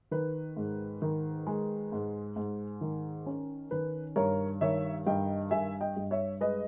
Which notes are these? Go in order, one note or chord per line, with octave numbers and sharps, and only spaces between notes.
D#3 B4
G#2
D#3
G#3
G#2
G#2
D#3
C#4
D#3 B4
G2 A#4 C#5
D#3 C#5 E5
G2 D#5 G5
G2 E5 G#5
D#5 G5
G2
C#5 E5
G#3 B4 D#5